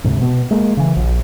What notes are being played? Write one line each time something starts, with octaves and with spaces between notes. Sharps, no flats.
D2 G#2 C3
B2 B3
G#3 A#3
C#3 E3
A#1